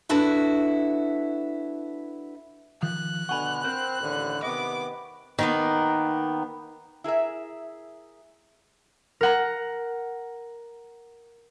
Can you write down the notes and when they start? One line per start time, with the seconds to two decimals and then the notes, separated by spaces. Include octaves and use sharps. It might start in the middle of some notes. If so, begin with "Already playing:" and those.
0.09 D4 E4 F#4 A4 B4
2.83 D#3 F3 F#6
3.29 B2 D3 F#5 G#5 B5 C#6
3.64 C4 A#4 C5
4.00 A1 D#2 D3
4.43 C3 D#3 B3 D#5 D6
5.39 D#3 A#3 B3
7.04 E4 G#4 A#4 E5
9.21 A#4 F#5 A#5